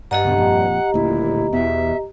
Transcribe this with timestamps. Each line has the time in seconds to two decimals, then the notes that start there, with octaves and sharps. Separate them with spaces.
0.11 G2 G4 D#5 F#5 A#5
0.25 C#2 B2 D3
0.38 F2 A#2
0.94 D#1 D2 A#2 E4
1.53 E2 B2 E5